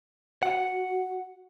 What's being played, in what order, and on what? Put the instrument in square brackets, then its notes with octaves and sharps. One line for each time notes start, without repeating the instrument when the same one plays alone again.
[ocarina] F#4 [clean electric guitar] F#5